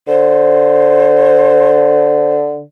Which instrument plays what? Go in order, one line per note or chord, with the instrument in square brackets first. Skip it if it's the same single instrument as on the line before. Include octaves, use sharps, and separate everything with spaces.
[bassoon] D3 [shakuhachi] C5